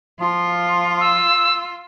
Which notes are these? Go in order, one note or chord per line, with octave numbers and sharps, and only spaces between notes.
F3 F4
E6